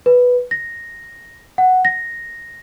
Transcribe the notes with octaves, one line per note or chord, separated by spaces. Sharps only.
B4
A#6
F#5
A#6